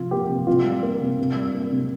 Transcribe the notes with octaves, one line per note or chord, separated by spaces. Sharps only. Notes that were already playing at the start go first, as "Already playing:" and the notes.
Already playing: C3 F3 F4
A#3 G4
C3
C3 F4
G3
A#3
C3
C3
G3
A#3
C3